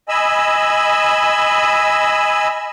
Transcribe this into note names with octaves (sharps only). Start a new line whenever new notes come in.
D#5 G#5 B5 E6